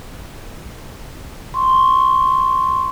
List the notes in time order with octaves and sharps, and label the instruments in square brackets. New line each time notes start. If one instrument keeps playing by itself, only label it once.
[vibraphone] C6 C#6